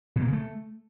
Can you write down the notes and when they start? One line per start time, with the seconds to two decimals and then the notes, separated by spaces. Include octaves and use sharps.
0.16 B2
0.21 A#3
0.27 C#3
0.33 A3